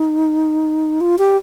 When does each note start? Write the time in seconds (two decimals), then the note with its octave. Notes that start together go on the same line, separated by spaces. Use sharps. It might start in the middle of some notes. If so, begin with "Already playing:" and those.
Already playing: D#4
1.01 F4
1.18 G4